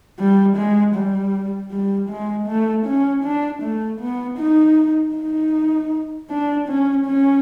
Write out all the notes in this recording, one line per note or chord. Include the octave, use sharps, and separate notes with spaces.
G3
G#3
G3
G3
G#3
A3
C#4
D4
A3
B3
D#4
D#4
D4
C#4
C#4